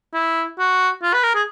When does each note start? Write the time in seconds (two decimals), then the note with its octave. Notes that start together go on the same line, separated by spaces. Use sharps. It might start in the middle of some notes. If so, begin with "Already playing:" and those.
0.13 E4
0.59 F#4
1.03 F4
1.13 B4
1.23 A#4
1.35 G#4